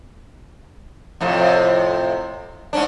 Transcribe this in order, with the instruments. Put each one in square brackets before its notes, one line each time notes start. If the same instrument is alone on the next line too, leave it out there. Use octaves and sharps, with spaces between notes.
[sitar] F2 A2 C3
G#2 C#4 D4